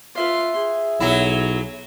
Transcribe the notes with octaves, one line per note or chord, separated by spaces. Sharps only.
F4 B4 E5 F5 C6
G#4
B1 F#3 E4